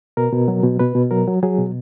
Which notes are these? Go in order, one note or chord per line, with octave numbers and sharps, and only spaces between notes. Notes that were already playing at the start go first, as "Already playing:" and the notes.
B2 A#4
B2
F#3
B2
B2 B4
B2
F#3 A#4
F#3
F#3 G#4
B2